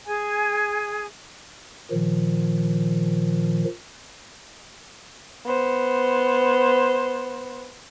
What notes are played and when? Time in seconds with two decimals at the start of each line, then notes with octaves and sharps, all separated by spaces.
0.06 G#4 G#5
1.91 A#2 D#3 F3
5.46 B3 C5